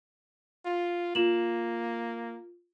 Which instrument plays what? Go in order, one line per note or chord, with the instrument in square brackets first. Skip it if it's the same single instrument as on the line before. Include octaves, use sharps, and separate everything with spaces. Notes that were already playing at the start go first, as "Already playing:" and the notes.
[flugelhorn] F4
[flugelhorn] A#3 [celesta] F4 E7 F#7